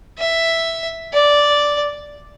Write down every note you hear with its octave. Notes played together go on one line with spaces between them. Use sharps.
E5
D5